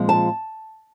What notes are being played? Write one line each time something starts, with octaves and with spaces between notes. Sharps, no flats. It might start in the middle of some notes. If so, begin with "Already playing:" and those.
Already playing: A#2 F3 G#3 C4
A5